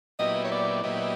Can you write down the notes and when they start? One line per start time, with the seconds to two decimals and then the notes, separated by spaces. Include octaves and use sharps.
0.19 A#2 F#3 B3 E4 G4 D#5
0.44 C#5
0.52 D5
0.83 A#2 F#3 B3 E4 G4 D#5